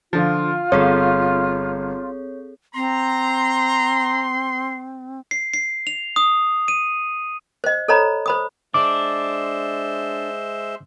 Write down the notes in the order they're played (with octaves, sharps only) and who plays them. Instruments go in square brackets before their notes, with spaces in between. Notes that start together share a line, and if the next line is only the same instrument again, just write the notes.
[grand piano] D3 F3 [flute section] F4
[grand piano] G1 [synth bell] C4 G#4 A4 [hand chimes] C#5
[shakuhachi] C4 [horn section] A#5 [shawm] C6
[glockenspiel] C7
C7
F7
D#6
D#7
[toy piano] C5 D#5
A4 C5 C#5 D#5 A#5 B5
C5 B5 D#6
[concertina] G#3 C5 E5 [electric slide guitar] D4 [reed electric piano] D6